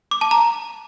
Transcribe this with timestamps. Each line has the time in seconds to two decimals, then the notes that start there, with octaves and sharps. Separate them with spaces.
0.11 D6
0.21 A5
0.31 A#5